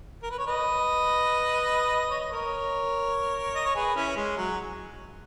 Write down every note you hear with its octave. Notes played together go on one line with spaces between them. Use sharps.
A#4
B4
C#5
B4 D#5
C#5
D#5
A#4 C#5
D#5
C#5
G#4 B4
C#4 E4
G#3
F#3